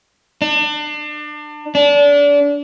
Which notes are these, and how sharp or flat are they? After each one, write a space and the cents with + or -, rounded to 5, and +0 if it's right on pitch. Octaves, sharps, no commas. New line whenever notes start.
D4 +30
D4 -30